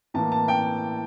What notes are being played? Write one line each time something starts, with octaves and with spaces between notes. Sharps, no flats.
A2 E3 A#3 A5
A5
G5